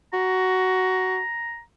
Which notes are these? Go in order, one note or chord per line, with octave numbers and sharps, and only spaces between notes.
F#4 A#5